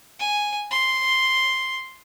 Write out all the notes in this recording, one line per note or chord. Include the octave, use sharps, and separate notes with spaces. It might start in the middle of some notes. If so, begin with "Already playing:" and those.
G#5
C6